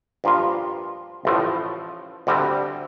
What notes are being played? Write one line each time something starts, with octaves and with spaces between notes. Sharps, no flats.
G2 F3 A#3 F4
A1 A2 F3 A3
D2 D3 G3 C4